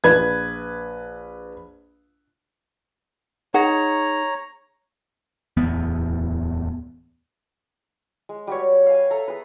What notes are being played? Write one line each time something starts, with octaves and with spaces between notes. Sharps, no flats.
A#1 B4 G#6
D#4 G#4 C#5 F#5 A#5
D1 E2 B3
G#3
G3 F#4 B4 C#5
F5 G#5
A4 E5 A#5
G#4 B4